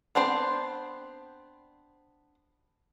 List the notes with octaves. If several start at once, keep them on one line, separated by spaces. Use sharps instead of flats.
B3 C4 D4 C5